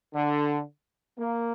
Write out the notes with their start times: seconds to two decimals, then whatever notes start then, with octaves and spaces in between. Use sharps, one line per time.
0.13 D3
1.19 A#3